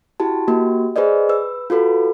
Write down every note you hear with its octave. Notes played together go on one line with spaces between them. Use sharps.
E4 F#4 G4 A5
A#3 F#4 G4
G#4 B4 C5 D5 D#5
B4 E6
F4 F#4 A4 B4